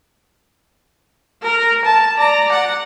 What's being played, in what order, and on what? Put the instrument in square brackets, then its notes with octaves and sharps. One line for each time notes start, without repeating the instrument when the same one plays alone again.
[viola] A#4
A5
D5 A#5
F#5